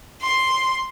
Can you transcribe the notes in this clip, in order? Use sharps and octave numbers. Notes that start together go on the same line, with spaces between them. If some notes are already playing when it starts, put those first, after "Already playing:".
C6